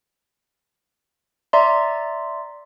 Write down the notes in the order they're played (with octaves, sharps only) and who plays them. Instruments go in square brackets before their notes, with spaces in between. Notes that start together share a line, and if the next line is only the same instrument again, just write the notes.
[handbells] D5 E5 A#5 C6